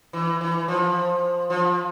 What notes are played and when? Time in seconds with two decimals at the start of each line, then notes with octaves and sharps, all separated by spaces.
0.13 E3
0.41 E3
0.68 F3
1.50 F3